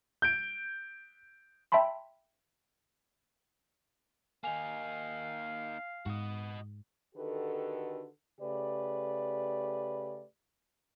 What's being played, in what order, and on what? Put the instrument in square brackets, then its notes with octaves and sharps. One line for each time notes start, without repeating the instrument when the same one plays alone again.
[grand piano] G6 D7
[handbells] E5 G5 A5 B5 C6
[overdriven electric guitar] A#3 D#4 [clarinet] F5 [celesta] G#5 F7
[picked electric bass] G#2 [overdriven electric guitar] F#4 D#5
[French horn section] D3 D#3 F#4 G4 A4 B4
C#3 A3 G4 B4 D5